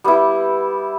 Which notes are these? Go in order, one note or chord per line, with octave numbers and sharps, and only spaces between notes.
G3 B3 E4